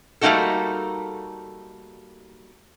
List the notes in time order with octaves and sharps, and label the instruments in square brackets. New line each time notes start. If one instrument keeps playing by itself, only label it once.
[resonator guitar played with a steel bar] G3 A3 A#3 D#4 F#4 A4